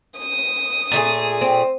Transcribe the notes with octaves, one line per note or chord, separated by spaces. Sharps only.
D#6
A#2 A3 G#4
C4